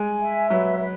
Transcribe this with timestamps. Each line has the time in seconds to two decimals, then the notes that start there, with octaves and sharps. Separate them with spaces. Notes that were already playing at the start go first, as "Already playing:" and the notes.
Already playing: G#3 G#5
0.21 E5
0.50 F#3 B4
0.80 B4